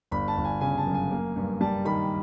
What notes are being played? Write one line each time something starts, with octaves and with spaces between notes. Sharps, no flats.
G1 B5
A5
G1
G#5
C#3 G#5
A5
F#2
G#5
A#3
G2
G3 A5
D#3 B5